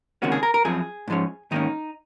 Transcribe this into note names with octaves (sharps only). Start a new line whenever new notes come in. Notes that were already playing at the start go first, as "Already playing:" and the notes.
C#2 C3 D#3 A#3 C#4 F#4
G#4
A#4
A#4
F#2 F3 C4 G#4
G#2 F3 G#3 C#4
G#2 D#3 A#3 C#4 D#4